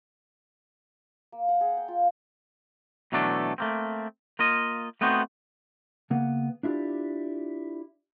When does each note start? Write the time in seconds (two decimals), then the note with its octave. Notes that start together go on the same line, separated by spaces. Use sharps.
1.32 A#3
1.49 F#5
1.61 G#4
1.77 G5
1.88 F4
3.12 B2 E3 F#3 A3 D4 A4
3.58 A3 A#3 C4
4.39 A#3 F4 D#5
5.01 A3 B3 C4 D#4 F#4 C5
6.10 C#3 A#3 B3 F#5
6.63 D4 E4 F4 G4 D5